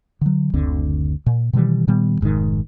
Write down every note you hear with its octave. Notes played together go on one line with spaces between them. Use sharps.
D3 F#3
F#1 D2 D3 C4
A#2
B2 D#3 E3 G3
A#2 D#3 G3 B3
F1 G#2 C3 D#3